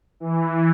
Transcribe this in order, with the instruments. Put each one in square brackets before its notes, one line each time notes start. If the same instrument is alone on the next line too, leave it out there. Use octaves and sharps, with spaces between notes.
[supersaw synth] E3